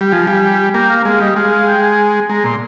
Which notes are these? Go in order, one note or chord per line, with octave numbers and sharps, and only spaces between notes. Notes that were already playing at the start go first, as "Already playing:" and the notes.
G3
F3 G#5
G3 G#5
A#3 G5
F5
G#3 F5
G3 D#5
G#3 F5
F5
G5
G#5
G#3 A#5
A#2 C6